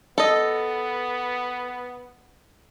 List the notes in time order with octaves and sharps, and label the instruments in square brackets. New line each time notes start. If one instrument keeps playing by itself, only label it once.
[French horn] B3 [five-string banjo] A4 D#5